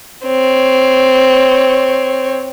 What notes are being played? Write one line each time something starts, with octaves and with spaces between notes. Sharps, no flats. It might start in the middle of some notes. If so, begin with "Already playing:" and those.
C4 C#5